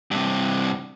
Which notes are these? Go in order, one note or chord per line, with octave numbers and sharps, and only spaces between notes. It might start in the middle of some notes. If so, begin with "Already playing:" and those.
G2 C3